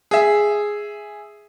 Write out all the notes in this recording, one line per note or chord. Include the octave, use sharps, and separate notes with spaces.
G#4 E5